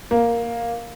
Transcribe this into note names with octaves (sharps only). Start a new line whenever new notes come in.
A#3